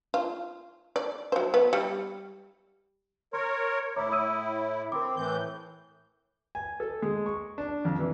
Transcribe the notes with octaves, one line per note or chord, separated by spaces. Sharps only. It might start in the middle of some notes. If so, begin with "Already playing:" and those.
F4
D5
F#3 C5
B3
G3
A#4 C#5 C6
A2 E4 C#5 A#5 D6
D#6 E6 D#7
C4 A#4 D6
A2 E3 G6
G#5
A4
G#3
C#6
D4
F2
E3